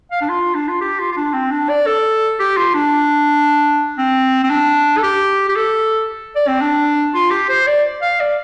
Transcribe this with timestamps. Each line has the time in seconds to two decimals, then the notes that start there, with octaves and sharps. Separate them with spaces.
0.11 F5
0.21 D4
0.29 F4
0.55 D4
0.68 F4
0.81 G4
0.99 F4
1.12 F4
1.17 D4
1.33 C4
1.51 D4
1.69 D5
1.86 A4
2.40 G4
2.57 F4
2.74 D4
3.98 C4
4.44 C4
4.50 D4
4.98 A4
5.03 G4
5.49 G4
5.56 A4
6.36 D5
6.48 C4
6.61 D4
7.14 F4
7.31 G4
7.49 C5
7.67 D5
8.02 F5
8.20 D5